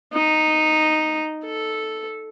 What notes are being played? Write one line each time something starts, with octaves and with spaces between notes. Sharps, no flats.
D#4
A4